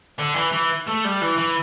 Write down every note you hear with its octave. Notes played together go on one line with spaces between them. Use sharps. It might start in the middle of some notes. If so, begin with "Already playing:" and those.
D3
E3
E3
A3
G3
E3
E3